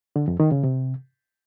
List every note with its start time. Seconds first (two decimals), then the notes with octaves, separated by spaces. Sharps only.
0.16 D3
0.28 F2
0.40 D#3
0.52 C#3
0.64 C3